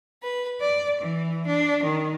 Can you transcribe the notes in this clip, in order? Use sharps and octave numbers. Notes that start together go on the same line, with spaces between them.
B4
D5
E3
D4
D#3